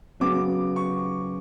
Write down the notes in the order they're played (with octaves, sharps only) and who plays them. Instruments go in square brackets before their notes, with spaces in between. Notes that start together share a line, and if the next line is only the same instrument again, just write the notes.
[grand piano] C#3 F#3 B3 D6
C#6